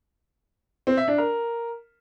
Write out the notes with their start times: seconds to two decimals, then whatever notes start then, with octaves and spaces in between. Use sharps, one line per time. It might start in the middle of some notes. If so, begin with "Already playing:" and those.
0.87 C4
0.97 E5
1.08 D4
1.18 A#4